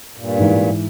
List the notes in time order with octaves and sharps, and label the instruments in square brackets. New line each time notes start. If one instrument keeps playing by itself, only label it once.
[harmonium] G2 A#2
[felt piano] G#2 E3